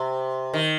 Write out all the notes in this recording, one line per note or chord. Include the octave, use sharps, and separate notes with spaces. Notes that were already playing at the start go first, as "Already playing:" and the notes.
Already playing: C3
D#3